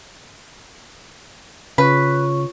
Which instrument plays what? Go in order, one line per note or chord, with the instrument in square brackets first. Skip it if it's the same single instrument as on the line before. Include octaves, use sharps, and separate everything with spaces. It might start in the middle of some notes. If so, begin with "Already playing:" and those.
[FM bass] C#3 [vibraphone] F4 C#5 C#6 [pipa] B4